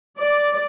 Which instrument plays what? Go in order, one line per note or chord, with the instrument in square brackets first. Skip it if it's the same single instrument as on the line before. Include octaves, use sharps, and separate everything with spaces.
[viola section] D5